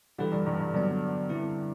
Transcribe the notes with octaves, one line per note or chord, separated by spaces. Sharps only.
D3 E3 G3 D4 G4 B4
G2
G2
G2
G2 D3 F#3 B3
D3 G3 C4 E4 B4